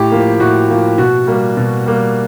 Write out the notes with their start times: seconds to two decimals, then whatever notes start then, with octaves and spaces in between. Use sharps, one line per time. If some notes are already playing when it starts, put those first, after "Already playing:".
Already playing: A2 G4
0.12 F3 A#3
0.40 A2 F#4
0.69 F3 A#3
0.98 B2 F#4
1.27 G3 A#3
1.57 B2
1.86 G3 A#3